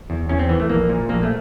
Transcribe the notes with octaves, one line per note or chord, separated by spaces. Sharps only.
E2
E2 C#4
C4
E3 B3
A3
A#1 A#3
A#2
A#1 A#3
A3